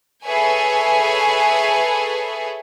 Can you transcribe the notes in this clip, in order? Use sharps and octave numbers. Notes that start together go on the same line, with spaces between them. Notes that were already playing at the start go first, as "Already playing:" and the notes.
G#4 A4 B4 C#5 E5 G#5